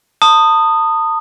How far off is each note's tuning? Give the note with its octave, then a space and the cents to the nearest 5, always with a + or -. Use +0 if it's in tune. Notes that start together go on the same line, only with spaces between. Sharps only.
A5 +40 D#6 -10